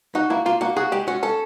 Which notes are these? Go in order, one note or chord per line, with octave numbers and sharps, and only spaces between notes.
D#4 F#4
A#3 E4
A#3 F4
A#3 F#4
F#4 G#4
G#3 G4
C#4 F#4
C#4 A4